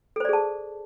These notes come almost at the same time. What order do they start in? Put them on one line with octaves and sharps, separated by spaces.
A4 C5 D5 G#4 A5